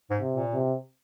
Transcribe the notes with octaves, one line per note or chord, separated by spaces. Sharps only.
G#2
C3
A#2
C3